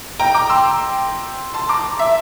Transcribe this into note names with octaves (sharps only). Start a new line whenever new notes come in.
G5 A#5
A#5 D6
C6 E6
A5 C6
A#5 D6
E5